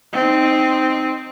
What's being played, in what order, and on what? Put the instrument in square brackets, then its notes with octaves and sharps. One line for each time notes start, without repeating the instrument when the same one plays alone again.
[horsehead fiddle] C4 D#4